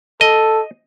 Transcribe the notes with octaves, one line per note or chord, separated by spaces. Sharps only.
A4 D#5